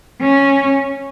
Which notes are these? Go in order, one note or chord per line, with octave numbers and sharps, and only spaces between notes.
C#4